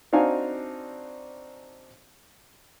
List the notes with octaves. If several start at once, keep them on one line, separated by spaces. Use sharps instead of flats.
C4 D4 D#4 F#4 F5 G#5